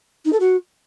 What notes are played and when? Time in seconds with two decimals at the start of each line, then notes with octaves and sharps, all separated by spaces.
0.25 D#4
0.32 A4
0.40 F#4